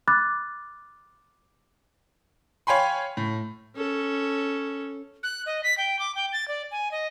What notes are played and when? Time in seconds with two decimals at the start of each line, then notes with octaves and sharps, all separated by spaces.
0.08 B5 D6 F6 F#6 A6
2.67 C#5 F5 G5 G#5 B5 C6
3.17 A2
3.75 C#4 A4
5.23 F#6
5.46 D#5
5.64 B6
5.78 G5
5.99 D6
6.15 G5
6.33 A6
6.48 D5
6.71 G#5
6.92 D#5